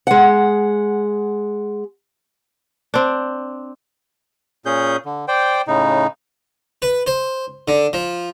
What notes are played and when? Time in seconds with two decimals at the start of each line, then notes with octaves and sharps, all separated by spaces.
0.07 G#3 F#5
2.94 C4 D4
4.66 A#2 C#4 G#4 G6
5.05 D3
5.28 C5 D5 G5
5.68 A2 C#3 D#4
6.82 B4
7.07 C5
7.68 D3
7.93 F3